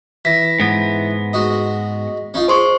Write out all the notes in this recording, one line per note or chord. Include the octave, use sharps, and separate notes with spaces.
E3 A#6 B6
G#2 B3
G#3 F#4 D#5
C#4 D#4 F4
G#4 C5 C6 C#6